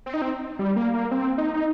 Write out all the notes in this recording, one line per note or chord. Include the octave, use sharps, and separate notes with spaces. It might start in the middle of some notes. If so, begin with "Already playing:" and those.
C4
D#4
C4
G3
A#3
A#3
C4
D#4
D#4